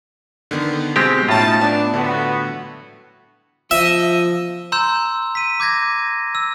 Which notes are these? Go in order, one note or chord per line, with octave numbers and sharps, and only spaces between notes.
D3 D#3 B3
B2 G#3 C4 G4
A2 C#4 D#4 F4 A5
B3 D4
D3 A3 B3 F#4
F3 D#5 E5
A#5 C6 E6 G6 E7
B6 D#7
D6 G6 G#6 A#6
E6